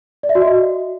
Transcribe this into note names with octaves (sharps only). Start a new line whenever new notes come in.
D5
E5
F#4
D#5